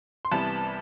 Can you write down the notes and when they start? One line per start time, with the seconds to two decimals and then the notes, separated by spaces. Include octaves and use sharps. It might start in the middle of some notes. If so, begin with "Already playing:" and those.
0.25 C6
0.32 C2 C3 E3 G3 B3 A5 B5